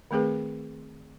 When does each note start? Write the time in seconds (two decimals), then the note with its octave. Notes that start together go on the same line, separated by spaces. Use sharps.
0.11 D#3 A3 C4 G#4 B4